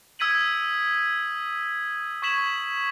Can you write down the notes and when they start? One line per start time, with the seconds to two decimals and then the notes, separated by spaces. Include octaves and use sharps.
0.19 D#6 E6 G#6 B6 D#7 F#7
2.22 C#6 E6 G#6 B6 E7 F#7